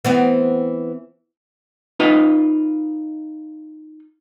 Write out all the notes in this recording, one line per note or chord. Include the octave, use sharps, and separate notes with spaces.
E3 B3 C4
D#4 F4 B4 D#5